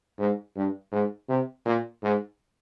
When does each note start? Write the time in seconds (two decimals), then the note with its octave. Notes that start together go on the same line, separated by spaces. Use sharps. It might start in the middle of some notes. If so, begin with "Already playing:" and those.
0.19 G#2
0.56 G2
0.92 G#2
1.28 C3
1.65 A#2
2.03 G#2